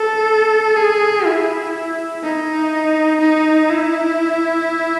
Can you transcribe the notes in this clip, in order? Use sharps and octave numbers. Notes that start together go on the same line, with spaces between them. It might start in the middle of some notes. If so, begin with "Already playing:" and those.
Already playing: A4
G#4
E4
D#4
D#4
E4